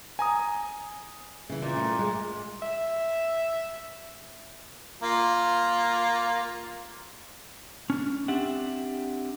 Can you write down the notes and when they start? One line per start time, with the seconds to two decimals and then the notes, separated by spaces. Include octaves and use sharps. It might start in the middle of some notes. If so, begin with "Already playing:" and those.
0.19 G#5 A#5 D#6
1.49 C#3 E3
1.62 A#2
1.77 A3
1.99 G#3
2.62 E5
5.03 A#3 F4
7.90 C#4 D4
8.28 C4 D4 G4 E5 F#5